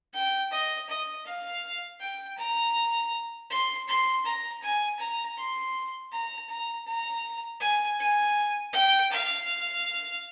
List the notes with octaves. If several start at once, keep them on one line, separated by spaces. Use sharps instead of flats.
G5
D#5
D#5
F5
G5
A#5
C6
C6
A#5
G#5
A#5
C6
A#5
A#5
A#5
G#5
G#5
G5
F5